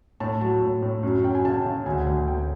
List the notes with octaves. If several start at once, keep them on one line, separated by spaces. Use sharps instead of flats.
A2 A5
F#3 A5
A2
A2
F#2
F#2 G5
G#5
C#3 A5
C#3
D2 G#5
D2
D2 G5